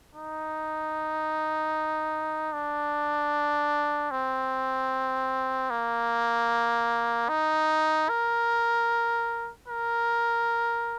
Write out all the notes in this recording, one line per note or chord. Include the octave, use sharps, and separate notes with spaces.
D#4
D4
C4
A#3
D#4
A#4
A#4